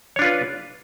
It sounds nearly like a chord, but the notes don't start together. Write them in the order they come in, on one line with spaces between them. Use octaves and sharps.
C#5 D4 F4 B4